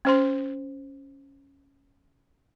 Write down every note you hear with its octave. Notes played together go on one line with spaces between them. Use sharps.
C#4 C5 C6